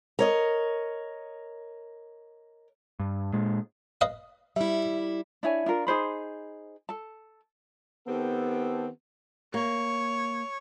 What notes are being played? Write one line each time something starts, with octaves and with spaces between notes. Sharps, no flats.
A#4 C#5 D#5
G2
A#2 G#3
B4 D#5 F5
G3 E4 E5
D4 E4 C#5 G#5
D4 F4 A#4
D#4 G#4 C5 B5
A4 A5
D#3 B3 C4 G4 A4
A#3 C#5